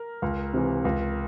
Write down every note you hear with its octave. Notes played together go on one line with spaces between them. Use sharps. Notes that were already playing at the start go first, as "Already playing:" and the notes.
Already playing: A#4
C#2
C3 E3
C#2